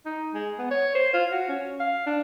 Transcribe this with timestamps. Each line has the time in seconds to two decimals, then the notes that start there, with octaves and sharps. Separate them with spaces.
0.06 D#4
0.34 G#3
0.59 B3
0.71 C#5
0.95 C5
1.14 F4
1.32 F#4
1.48 C#4
1.80 F5
2.06 D4